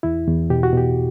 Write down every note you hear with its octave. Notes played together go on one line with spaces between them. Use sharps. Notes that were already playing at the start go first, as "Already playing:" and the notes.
E2 E4
E2
B2 G4
F#4
B2 G4